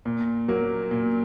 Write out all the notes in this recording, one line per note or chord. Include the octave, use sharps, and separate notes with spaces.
A#2
F#3 A#3
A#2